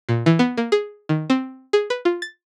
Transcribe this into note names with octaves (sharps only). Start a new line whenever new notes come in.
A#2
E3
B3
A#3
G#4
D#3
C4
G#4
B4
F4
A6